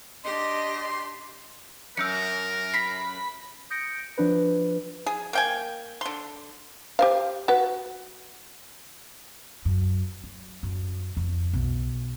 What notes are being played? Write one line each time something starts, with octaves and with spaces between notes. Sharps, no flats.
D4 G4 D#5 C6
F#2 A#4 E6 G6 C#7
B5 B6 C7
D#6 G6 A#6 C#7 D7
F3 D4 B4
G#4
A#3 G5 G#5
D3 C6
G4 C5 F5
F#4 B4
F#2
F#3
F#2
F2
B1